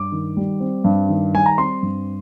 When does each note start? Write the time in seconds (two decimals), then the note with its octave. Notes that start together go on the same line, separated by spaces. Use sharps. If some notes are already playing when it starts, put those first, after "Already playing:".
Already playing: G2 D6
0.12 D#3
0.37 G3
0.60 C4
0.84 G2
1.09 D#3
1.33 G3 G#5
1.46 A#5
1.58 C4 C6
1.83 G2